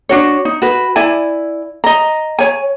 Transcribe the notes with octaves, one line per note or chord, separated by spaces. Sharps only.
D4 F#4 C#5
D#4
F#4 B4
E4 D5 G#5
D#5 A#5
C#5 G#5